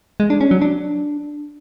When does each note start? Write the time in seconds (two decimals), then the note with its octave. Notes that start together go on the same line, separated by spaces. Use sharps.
0.20 G#3
0.30 D4
0.41 C#4
0.51 F#3
0.62 D4